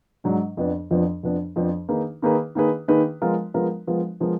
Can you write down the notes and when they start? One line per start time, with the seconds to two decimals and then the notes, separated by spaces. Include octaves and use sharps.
0.24 G#2 F#3 D4
0.57 F2 F3 B3 D4
0.91 F2 F3 B3 D4
1.23 F2 F3 B3 D4
1.56 F2 F3 B3 D4
1.89 D#3 A#3 D#4 G#4 B4
2.22 D#3 A#3 D#4 G#4 B4
2.55 D#3 A#3 D#4 G#4 B4
2.88 D#3 A#3 D#4 G#4 B4
3.22 F3 G#3 B3 F4 A#4
3.54 F3 G#3 B3 F4 A#4
3.87 F3 G#3 B3 F4 A#4
4.20 F3 G#3 B3 F4 A#4